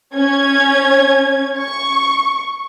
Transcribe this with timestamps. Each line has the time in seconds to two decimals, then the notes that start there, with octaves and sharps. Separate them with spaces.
0.15 C#4 G#6
1.58 C#6